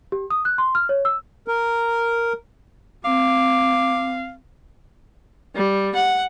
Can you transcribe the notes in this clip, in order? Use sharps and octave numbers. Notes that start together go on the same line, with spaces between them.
G4
D#6
F#6
C6
F6
C#5
E6
A#4
C4 F5 D6
G3
F#5